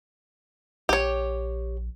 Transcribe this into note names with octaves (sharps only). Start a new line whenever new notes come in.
A#1 G4 C#5